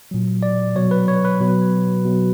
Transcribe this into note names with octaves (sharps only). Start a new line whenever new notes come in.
A#2 F#3
D5
B2 F#3 C#5
B4
C#5
B4
B2 F#3
B2 F#3